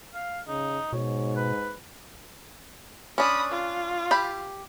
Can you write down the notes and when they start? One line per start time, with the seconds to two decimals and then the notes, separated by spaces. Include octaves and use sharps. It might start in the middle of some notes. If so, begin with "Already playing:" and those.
0.14 F5
0.48 C#3 D#4
0.93 G#2 B2 C#5
1.36 B4
3.18 C#4 D4 B5 D#6
3.51 F4
4.11 G4 B5